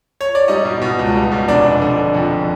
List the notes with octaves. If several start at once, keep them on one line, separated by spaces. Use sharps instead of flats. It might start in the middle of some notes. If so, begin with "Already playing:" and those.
C#5
D5
G3 D#4 D#5
B2
B2
C#2
G3
B2
F1 D4 D5
F1
D3
D3
F2